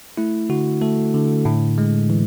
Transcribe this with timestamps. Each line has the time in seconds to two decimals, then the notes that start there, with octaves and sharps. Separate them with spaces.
0.17 A3 E4
0.49 D3 F#4
0.82 A3 A4
1.14 D3
1.45 A2
1.78 G#3
2.10 E3